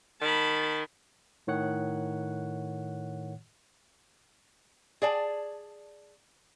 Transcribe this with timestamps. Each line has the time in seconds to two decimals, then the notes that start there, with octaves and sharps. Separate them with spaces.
0.22 D#3 A5 B5
1.47 A2 D#3 C#5 F#5 F#6
5.02 G#4 D5 A5